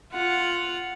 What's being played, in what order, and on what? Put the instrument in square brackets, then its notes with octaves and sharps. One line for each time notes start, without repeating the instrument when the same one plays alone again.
[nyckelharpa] F4 F#5